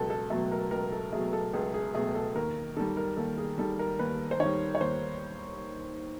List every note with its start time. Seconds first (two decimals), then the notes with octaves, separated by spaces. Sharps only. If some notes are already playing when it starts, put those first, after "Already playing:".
Already playing: C#2 B2 F#3 A4
0.10 A4
0.30 B2 F#3 A3 A4
0.52 A#4
0.71 C#2 A#4
0.92 A4
1.12 B2 F#3 A3 G#4
1.33 A4
1.53 C#2 G#4
1.74 G#4
1.94 B2 F#3 A3 G#4
2.15 A4
2.35 D#2 A#4
2.77 D#3 G3 A4
2.97 A#4
3.17 D#2 A4
3.38 G#4
3.58 D#3 G3 A4
3.79 A#4
3.99 D#2 B4
4.31 C5
4.40 D#3 G3 C#5
4.75 C#5
4.81 D#2 C5